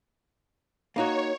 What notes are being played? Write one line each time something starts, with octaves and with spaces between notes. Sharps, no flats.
A#3 D#4 F#4 C#5